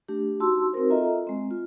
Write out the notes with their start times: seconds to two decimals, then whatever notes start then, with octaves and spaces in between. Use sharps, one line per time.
0.08 A3 D4 G4
0.40 D#4 F#4 A5 C6 E6
0.73 C4 D#4 F#4 A#4 C5
0.90 F4 A4 D#5 E5 A#5
1.27 G#3 C4
1.51 F4